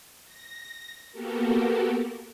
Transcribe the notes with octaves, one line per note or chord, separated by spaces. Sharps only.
A#6
A#3 B3 F#4 G4 A4 A#4